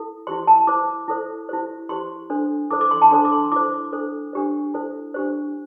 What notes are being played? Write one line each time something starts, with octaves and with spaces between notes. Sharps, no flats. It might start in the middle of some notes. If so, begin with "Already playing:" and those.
Already playing: E4 A4
E4 G4 C5 C6
A5
E4 C5 D6
E4 A4 C5
E4 G4 C5
E4 G4 C5 C6
D4 A4 C5
E4 A4 C5 D6
D6
C6
A5
D4 A4 C5 C6
D6
C6
E4 A4 C5 D6
D4 A4 C5
D4 G4 C5
E4 A4 C5
D4 G4 C5